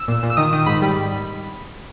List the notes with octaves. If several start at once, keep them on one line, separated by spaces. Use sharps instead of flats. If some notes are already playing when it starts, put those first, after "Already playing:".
Already playing: E6
A#2
A#2
E6
D#3 D#6
D#3 D#6
G#2 B5
G3